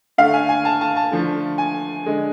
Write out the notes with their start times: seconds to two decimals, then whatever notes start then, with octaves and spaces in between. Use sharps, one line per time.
0.18 D3 A3 F5
0.33 G#5
0.49 G#5
0.65 A5
0.81 A5
0.96 A5
1.12 D3 F3 A3
1.58 G#5
2.06 D3 G#3